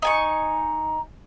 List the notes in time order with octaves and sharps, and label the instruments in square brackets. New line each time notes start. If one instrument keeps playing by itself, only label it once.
[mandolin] D#4 G#5 C#6 [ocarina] A#5